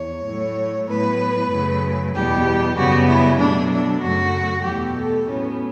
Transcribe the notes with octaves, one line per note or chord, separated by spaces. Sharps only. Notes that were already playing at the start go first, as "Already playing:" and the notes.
Already playing: E2 C#5
A2 F#3 A3
A2 F#3 B3 B4
F#2 C#3 F#3 A3
E2 B2 G3 B3 G4
F#2 C#3 G3 B3 F#4
E4
B2 F#3 A3 D4
D4
F#2 C#3 F#3 A3 F#4
E2 B2 A3 G4
A4
A2 F#3 B3 C#4